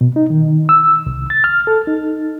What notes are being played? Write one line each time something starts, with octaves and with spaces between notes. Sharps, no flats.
B2
D#4
D#3
E6
C2
A6
F6
A4
D#4